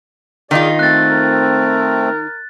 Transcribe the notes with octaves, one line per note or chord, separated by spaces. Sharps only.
D#3 D#4 F4 G#4 D5
A3 C4 F#6 A6
A#4